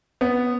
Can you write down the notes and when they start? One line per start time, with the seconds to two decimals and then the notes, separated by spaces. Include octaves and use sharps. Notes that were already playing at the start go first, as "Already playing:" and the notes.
0.21 B3